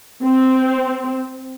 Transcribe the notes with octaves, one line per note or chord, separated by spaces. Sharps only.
C4